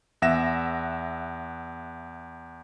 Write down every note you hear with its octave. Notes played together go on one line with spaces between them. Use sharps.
E2 E5 F#5 A#6 E7